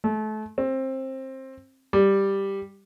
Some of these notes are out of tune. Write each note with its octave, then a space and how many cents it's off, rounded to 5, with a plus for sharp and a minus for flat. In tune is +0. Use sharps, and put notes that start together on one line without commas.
A3 -30
C4 +20
G3 +5